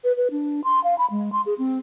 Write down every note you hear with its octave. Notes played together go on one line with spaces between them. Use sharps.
B4
B4
D4
C6
F5
B5
G#3
C6
G#4
C4